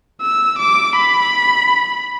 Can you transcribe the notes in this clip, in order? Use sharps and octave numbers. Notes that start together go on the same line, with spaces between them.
E6
D6
B5